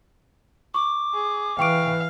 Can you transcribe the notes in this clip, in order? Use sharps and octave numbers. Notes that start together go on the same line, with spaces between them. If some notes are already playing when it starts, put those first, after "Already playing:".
C#6 D6
G#4
E3 F5 G5 C#6 D7